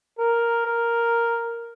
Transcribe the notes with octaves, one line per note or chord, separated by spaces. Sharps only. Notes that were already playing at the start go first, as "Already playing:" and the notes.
A#4
A#4